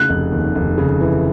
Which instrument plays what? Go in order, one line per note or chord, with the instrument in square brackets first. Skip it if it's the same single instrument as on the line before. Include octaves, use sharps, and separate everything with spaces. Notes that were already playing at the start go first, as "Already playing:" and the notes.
Already playing: [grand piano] C#3 [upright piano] F#6
[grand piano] F1
D#2
F1
C#3
E3